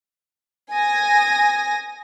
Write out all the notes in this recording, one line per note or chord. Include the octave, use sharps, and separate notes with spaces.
G#5 D#6 A#6